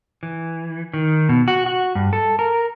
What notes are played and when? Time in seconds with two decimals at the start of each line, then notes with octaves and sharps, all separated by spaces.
0.23 E3
0.93 D#3
1.29 B2
1.48 F#4
1.66 F#4
1.95 G2
2.13 A4
2.39 A#4